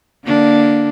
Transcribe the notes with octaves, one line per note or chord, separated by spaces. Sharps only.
D3 A#3 D4